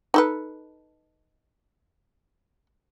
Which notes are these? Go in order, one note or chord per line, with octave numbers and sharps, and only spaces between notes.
D#4 A4 B4